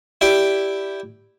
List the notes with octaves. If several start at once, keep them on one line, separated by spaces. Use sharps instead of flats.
E4 G4 D5 G5